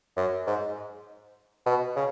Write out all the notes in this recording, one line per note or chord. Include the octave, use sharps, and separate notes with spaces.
F#2
G#2
B2
C#3